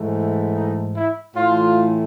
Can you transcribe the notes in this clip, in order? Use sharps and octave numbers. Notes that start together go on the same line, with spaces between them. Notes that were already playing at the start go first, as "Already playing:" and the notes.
Already playing: G#2 E3 A3
D#4
E4
A2 E3 A3 F4